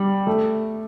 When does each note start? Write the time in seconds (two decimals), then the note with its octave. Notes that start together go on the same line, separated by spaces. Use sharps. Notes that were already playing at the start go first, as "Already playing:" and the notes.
Already playing: G3
0.27 A3